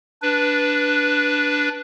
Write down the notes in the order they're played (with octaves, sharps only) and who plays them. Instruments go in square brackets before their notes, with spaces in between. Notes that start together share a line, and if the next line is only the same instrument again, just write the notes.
[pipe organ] D4 B4